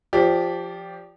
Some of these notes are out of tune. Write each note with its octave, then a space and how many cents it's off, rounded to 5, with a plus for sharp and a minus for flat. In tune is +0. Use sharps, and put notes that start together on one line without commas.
F3 -5 G4 +0 D5 -20